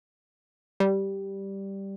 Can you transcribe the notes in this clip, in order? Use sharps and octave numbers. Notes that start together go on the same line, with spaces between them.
G3